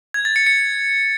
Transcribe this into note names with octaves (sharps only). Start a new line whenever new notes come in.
G#6
A6
C#7
C#7